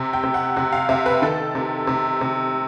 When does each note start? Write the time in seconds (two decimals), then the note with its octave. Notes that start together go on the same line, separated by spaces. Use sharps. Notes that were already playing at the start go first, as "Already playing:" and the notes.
Already playing: C3
0.13 G5
0.23 C3
0.34 F#5
0.56 C3 F#5
0.72 F5
0.89 C3 E5
1.06 B4
1.22 D#3 A4
1.55 C3
1.87 C3
2.21 C3